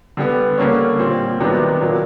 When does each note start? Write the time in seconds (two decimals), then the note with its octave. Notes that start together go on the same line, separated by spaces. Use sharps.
0.17 D3 G3 B3
0.58 D3 G3 A#3 C#4
0.99 A#2 G3 C4
1.40 C3 D#3 F#3 B3 D4
1.81 A#2 F#3 A#3 D4